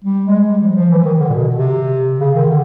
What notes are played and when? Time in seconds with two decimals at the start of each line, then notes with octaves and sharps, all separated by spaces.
0.04 G3
0.26 G#3
0.47 G3
0.62 F3
0.76 F3
0.90 E3
1.04 D#3
1.20 D3
1.30 A#2
1.33 B2
1.56 C3
2.20 C#3
2.35 D#3
2.49 D3